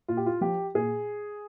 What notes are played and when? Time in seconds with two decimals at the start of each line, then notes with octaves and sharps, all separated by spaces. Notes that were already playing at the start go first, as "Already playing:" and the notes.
0.08 A#2 F4
0.17 G4
0.26 F4
0.41 F3 G4
0.74 A#2 G#4